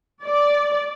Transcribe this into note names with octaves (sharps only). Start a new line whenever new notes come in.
D5